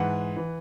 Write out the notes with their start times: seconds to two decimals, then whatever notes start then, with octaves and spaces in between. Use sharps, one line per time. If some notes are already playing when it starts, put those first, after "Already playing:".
Already playing: G#2 E3 F#5
0.37 E3